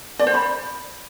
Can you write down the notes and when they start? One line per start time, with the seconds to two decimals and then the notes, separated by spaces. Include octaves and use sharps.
0.19 D5
0.27 C5
0.34 B5